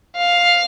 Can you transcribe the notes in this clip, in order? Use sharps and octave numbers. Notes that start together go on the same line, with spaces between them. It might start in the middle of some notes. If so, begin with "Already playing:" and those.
F5